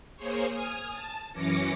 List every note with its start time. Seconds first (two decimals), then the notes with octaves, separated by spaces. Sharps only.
0.16 A#3 G#4 C5 C#5
0.47 G#5 D#6 F6
0.92 A5
1.33 F#2 E3 C#4 D6 A#6 C#7